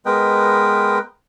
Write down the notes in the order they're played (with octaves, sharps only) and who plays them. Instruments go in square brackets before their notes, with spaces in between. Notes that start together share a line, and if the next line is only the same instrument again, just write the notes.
[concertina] G#3 B3 A#4 B4 D#5 G5